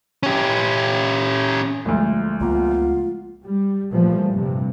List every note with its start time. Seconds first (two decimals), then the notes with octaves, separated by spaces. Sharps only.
0.23 C#4 G4
1.85 G1 D2 F3 G#3 A3
2.40 C#2 A#3 B3 F4
3.44 G3
3.91 A#2 E3 F3 G3 A3
4.32 G2 C3 G3